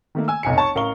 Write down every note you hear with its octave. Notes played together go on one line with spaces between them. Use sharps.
D#3 A3 A#3
G#5 E6
F1 B1 G#5 C#7
C#5 A5 C#6
A1 A#4 F5 C#6 G7